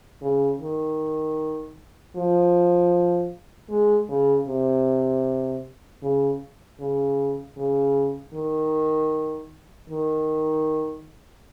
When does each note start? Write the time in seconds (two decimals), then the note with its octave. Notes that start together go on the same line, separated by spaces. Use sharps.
0.22 C#3
0.61 D#3
2.16 F3
3.70 G#3
4.09 C#3
4.48 C3
6.02 C#3
6.80 C#3
7.57 C#3
8.34 D#3
9.90 D#3